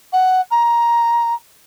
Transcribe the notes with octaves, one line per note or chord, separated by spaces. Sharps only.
F#5
A#5